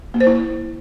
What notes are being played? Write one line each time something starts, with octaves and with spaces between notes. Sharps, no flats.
A#3
C5
E4